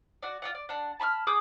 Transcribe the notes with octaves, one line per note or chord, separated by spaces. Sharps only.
F#4 D5
F4 D5 F#5
D5
D4 F#5
A5 B5 C#6 F6
G#4 D6 D#6 G6